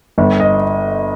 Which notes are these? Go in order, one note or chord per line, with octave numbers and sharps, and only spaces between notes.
G1
D#5